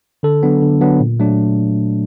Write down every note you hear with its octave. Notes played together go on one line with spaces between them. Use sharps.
D3 A4
F#3 B3 D4
D3
F#3 B3 D4
A#2
F#3 A3 D4